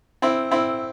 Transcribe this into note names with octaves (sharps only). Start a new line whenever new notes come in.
C4 E4
C4 E4